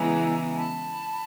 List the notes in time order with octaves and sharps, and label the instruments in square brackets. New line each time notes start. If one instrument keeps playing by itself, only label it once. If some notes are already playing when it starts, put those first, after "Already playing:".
Already playing: [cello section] C#3 E3 G#3 B3 E4 [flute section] G#5 A#5
[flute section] A5 B5